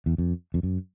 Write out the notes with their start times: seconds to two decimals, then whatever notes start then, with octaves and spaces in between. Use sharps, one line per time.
0.06 E2
0.18 F2
0.54 F2
0.63 F#2